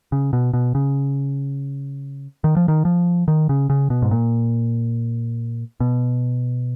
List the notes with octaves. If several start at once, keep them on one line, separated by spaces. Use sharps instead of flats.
C#3
B2
B2
C#3
D#3
F3
D#3
F3
D#3
C#3
C#3
B2
G#2
A#2
B2